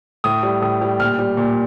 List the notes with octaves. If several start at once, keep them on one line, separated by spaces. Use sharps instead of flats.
A2 D#6
G3
A2 D#6
G3
A#2 F6
G3
A#2